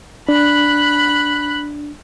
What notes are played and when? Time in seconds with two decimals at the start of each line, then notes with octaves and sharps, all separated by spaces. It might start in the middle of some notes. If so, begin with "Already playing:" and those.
0.29 D4 B5 F#6